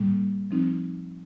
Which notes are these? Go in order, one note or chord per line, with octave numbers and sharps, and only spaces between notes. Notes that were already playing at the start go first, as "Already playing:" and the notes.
Already playing: A2 G3 A#3
F3 C4 D#4